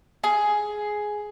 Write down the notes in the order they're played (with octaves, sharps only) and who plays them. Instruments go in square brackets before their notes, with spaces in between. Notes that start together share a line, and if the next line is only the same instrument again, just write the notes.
[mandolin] G#4